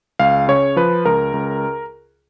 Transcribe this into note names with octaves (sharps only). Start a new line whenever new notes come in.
C#2 F5
C#3 C#5
F3 B4
C#2 A#4
C#2